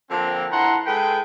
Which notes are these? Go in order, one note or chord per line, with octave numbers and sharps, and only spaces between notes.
D3 F3 A#3 C4
D4 E4 F#5 A#5 C6
G#3 A4 B4 G5